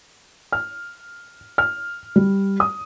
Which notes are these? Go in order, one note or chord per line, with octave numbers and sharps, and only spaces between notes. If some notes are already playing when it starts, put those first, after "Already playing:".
F6
F6
G3
D#6